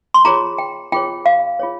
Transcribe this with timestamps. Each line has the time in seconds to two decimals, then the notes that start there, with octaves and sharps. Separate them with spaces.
0.14 C6
0.25 F4 G#4 C#5 A#5
0.58 G5
0.92 F4 G#4 C#5 G5
1.26 F5
1.59 F4 G#4 C#5